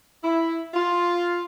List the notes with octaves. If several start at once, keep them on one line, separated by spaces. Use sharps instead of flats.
E4
F4